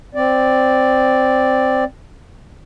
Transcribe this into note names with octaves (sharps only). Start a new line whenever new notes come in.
C4 D5